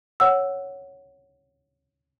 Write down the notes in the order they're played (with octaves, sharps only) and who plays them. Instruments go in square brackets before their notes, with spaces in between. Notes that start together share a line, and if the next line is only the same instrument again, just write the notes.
[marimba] C#5 F#5 E6